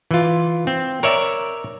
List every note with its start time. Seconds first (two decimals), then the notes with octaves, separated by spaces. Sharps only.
0.11 E3 F4
0.67 C4
1.03 A#4 C#5 D5 E5